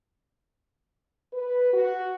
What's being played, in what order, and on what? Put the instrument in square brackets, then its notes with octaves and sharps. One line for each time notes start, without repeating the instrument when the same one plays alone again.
[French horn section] B4
F#4